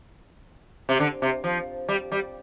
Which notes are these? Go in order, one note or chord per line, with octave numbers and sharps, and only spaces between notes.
C3
D3
C3
F3
G3
G3